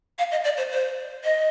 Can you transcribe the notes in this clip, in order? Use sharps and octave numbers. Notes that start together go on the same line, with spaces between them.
F5
D#5
D5
C5
C5
D#5